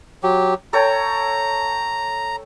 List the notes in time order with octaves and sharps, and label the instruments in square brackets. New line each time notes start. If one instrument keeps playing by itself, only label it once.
[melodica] F#3 G4
[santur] A4 C#5 G5 [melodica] A#5